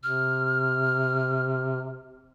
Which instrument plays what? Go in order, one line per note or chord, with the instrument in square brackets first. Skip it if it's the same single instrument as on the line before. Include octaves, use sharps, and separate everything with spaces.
[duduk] C3 [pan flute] F6